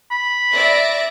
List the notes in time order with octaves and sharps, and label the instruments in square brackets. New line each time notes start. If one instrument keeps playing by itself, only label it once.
[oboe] B5
[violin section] D5 E5 A#6